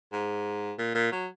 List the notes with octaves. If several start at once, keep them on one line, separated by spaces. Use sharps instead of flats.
G#2
A#2
A#2
F#3